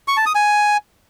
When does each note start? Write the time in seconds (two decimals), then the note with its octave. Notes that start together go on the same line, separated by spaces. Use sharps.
0.08 C#6
0.17 A5
0.26 D#6
0.35 G#5